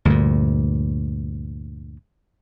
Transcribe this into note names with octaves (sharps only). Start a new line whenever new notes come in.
D2 G2 A#2